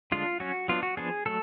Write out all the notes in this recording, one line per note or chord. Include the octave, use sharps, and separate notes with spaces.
D3 G#3 D4 F4
F#3 C#4 F#4
F#3 B3 D4 F4
F#4
F3 B3 D4 G#4
F#3 A3 A4